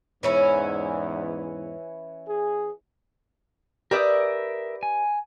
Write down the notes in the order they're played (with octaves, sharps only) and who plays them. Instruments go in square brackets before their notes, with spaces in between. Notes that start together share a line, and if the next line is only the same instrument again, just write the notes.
[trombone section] E2 G#2 [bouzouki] E3 C#4 E4
[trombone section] G#4
[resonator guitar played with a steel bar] G4 B4 D5 [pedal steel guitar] A#4 E5 D#6
[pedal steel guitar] G#5